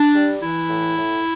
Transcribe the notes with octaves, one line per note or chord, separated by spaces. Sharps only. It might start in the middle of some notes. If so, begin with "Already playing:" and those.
Already playing: D4
G3
E3 E4
A2
A2